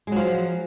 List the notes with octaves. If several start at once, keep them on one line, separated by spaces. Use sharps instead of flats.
F3 F#3 G#3